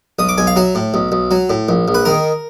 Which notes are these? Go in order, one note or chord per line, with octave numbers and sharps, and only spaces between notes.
B1 D#6
D6
B1 G#5
F5
F#3 E5
A2
B1
B1
F#3
A2
A#1
A#1
B4
D#3 A#4